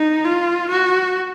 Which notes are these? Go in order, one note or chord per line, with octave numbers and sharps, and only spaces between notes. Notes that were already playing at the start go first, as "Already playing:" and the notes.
Already playing: D#4
F4
F#4